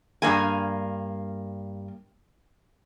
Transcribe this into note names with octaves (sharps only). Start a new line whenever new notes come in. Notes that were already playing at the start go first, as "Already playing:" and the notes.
G2 A#3 G#5